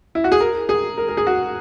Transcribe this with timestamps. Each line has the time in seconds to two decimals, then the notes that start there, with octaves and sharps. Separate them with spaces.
0.15 E4
0.24 F#4
0.32 G#4
0.40 A#4
0.69 G#4
0.98 A#4
1.08 A#4
1.17 G#4
1.27 F#4